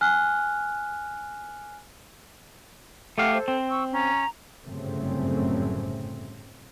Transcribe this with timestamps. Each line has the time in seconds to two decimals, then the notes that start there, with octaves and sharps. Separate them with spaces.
0.01 G#5 F6 F#6
3.18 A3 G4 F5 F#5
3.33 A4 C5
3.48 C4
3.70 C#6 E6
3.92 C#4 A#5
4.66 G1 F#2 A2 C#3 A3 C4